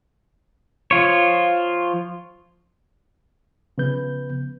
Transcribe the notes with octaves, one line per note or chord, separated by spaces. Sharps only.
F3 F4 C#5
C#3 F3 B3 B4 G6